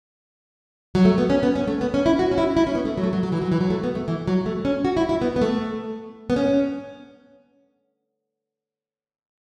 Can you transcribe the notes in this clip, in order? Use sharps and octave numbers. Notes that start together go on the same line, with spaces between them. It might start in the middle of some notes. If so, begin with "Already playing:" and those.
F#3
A3
B3
C#4
B3
C#4
A3
B3
C#4
E4
F#4
C#4
E4
E4
C#4
B3
A3
F#3
A3
F#3
F#3
E3
F#3
E3
F#3
A3
B3
A3
E3
F#3
A3
C#4
F#4
E4
E4
B3
B3
A3
B3
C#4